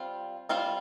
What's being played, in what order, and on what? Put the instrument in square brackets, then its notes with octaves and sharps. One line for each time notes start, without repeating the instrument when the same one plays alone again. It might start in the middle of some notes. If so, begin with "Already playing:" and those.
Already playing: [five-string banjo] G3 C4 F4 C5 F5
G3 C4 F4 C5 F5